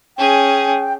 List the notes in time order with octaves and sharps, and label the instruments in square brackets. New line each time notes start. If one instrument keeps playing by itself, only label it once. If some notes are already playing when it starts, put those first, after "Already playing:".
[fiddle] C#4 G#4 [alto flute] G5